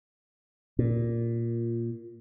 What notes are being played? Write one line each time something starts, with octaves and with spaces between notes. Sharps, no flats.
A#2